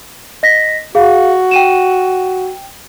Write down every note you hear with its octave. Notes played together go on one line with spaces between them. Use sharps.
D#5 A#6 B6
F#4 G#4 F5
G5 D#7 E7